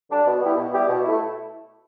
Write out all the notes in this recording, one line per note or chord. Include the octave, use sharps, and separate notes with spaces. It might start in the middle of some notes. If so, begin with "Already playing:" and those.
D3 G3 D4
B2
G3 B3 E4 G4
B2
G3 B3 E4 G4
B2
A3 E4